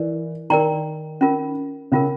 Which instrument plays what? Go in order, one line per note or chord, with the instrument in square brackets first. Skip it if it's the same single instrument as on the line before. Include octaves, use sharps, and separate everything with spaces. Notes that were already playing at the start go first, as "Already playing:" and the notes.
Already playing: [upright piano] E3 [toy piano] A#4 D5
[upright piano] D#3 [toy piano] A#4 D5 G5 A#5
[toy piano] C#4 F4 A#4
[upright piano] C#3 [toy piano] C#4 F4 A#4